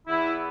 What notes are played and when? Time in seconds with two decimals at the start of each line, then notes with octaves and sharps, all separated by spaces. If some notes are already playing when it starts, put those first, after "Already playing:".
0.07 E2 E3 B3 E4